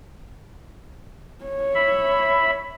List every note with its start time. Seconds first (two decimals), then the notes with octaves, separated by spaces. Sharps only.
1.45 C#5
1.75 E5 B5